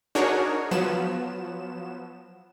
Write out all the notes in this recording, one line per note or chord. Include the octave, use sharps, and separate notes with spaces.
D4 D#4 F#4 G#4 A#4 C#5
F3 F#3 B3 E7